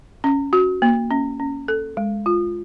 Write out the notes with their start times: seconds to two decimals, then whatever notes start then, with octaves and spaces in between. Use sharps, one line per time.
0.24 C#4
0.53 F#4
0.82 A#3
1.11 C#4
1.40 C#4
1.68 A4
1.97 G#3
2.26 F4